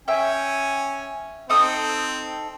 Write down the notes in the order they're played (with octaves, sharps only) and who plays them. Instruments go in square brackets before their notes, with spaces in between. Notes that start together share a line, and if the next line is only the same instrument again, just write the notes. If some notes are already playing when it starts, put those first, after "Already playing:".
[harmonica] C#4 G#5 [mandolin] E5 G5
[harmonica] C4 [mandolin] D#4 A4 D#6